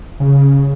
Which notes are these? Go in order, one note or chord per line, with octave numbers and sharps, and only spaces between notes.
C#3